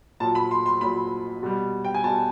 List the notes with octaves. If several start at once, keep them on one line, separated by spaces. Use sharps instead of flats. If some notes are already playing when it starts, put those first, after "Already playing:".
A#2 F#3 A5
B5
C6
C6
A#2 F#3 B5
B2 G3
G5
G#5
B2 G3 A5